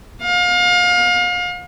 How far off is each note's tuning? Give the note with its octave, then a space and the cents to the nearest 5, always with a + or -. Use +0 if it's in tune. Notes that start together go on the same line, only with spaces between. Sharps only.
F5 +35